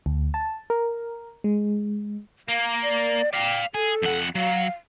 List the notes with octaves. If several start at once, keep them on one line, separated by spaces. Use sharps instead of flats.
D2
A5
A#4
G#3
A#3 F5
D5
D5 F5 G5
G#4 A4
F2 F#5
F#3 F5